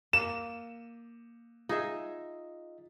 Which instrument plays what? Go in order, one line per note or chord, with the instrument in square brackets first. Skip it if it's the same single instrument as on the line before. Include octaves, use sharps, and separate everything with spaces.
[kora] A#3 [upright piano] E7
[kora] D#4 G#4 E5 [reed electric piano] F4 D#5